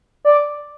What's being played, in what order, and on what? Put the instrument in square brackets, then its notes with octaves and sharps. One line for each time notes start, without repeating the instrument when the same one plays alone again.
[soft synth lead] D5